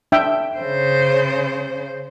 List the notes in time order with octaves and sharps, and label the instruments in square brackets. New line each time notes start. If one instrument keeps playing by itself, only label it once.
[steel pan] D4 E5 G5
[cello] C#3 C5